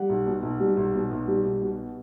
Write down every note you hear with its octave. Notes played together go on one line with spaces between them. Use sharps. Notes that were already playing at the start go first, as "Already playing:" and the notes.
Already playing: G3 F#5
B1
B2
B1
G3
B1
B2
B1
G3
B1
B2